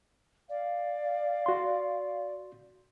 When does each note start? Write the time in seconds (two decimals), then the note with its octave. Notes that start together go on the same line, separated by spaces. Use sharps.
0.49 D5 F5
1.46 F#4 C6